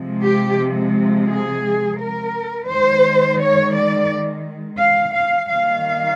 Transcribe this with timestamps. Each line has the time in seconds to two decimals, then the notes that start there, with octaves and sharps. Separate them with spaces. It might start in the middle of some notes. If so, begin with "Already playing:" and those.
Already playing: C3 F3 G#3
0.24 G4
1.29 G#4
1.98 A#4
2.69 D#3 G#3 C5
3.39 C#5
3.75 D5
4.80 F5
5.14 F5
5.50 D#3 G3 A#3 F5